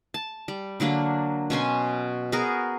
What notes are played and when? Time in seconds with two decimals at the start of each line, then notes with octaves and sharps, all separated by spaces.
0.14 A5
0.48 G3
0.80 D3 F#3 A#3 D4
1.50 B2 C#4 G#5 C6
2.32 B3 F#4 G#4 A#4